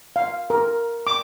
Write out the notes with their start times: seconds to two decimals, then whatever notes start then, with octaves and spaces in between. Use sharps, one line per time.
0.16 F5
0.50 A#4
1.07 D6